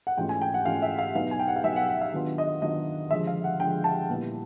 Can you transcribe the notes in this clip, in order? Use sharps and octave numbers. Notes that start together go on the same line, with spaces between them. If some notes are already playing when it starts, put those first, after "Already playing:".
F#5
G#2 E3 A3 C#4 F4 G5
G#5
G5
F#5
G#2 E3 A3 C#4 F4 F5
E5
F5
B2 F#3 B3 D#4 F5
G#5
G5
F#5
F5
B2 F#3 B3 D#4 E5
F#5
F#5
F5
D#3 F#3 B3 D4 F4
D#5
D#3 F#3 B3 D4 F4 D#5
D3 F3 G#3 E5
F5
F#5
D3 F3 G#3 G5
A5
A#2 G3 B3 E4